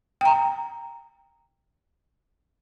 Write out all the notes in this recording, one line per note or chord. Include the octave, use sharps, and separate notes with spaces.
G5 A#5